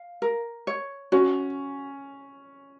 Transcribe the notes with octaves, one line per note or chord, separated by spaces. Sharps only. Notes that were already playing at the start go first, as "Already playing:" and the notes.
Already playing: F5
A#4
C#5
C#4 F#4